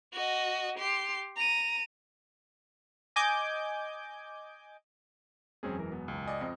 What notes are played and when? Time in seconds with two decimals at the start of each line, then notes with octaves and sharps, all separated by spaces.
0.13 F#4 D#5
0.79 G4 C6
1.36 A#5 D#7
3.16 D#5 G#5 D6 G6
5.63 E1 F#2 C4 C#4 G#4
5.78 E3 A#4
5.92 B3
6.08 C#2
6.26 D5 D#5 G#5
6.41 F2 C4 D#5